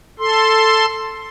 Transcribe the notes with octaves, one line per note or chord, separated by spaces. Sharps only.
A4 C6